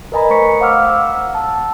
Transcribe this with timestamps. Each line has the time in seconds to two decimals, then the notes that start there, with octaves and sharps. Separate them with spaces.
0.12 A#4 B4 D#5 G#5 A#5 B5
0.30 A3 C5 C#6 B6 C#7
0.60 C5 F5 F#5 D6 E6 F6
0.87 F#5 E6
1.35 A5 E6